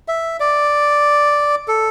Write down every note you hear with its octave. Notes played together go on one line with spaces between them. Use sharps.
E5
D5
A4